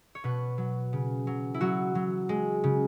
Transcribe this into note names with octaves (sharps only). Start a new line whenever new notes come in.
C#5
B2 B4
F#3
C#3
F#3
E4
F#3 F#4
F#3
G#3
C#3